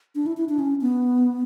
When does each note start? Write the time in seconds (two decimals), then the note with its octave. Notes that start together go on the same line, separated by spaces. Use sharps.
0.15 D4
0.26 E4
0.37 E4
0.49 D4
0.59 C#4
0.81 B3